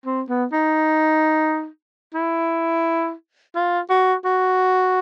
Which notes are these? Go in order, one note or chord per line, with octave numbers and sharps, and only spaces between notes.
C4
B3
D#4
E4
F4
F#4
F#4